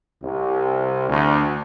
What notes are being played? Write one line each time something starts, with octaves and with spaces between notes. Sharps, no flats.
C2
D2